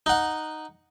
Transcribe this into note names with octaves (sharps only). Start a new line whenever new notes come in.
D#4 F#5